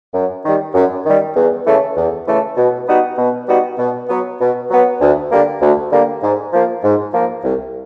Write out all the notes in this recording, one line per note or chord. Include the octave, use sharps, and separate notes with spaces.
F#2
D#3 G3
F#2
D#3 G3
E2
C#3 E3 A3
E2
C#3 E3 A3
B2
G3 B3 D#4 F#4
B2
G3 B3 D#4 F#4
B2
F#3 B3
B2
F#3 B3
D2
D3 G3 A#3
D2
D3 G3 A#3
G#2
F3 A#3
G#2
F3 A#3
C2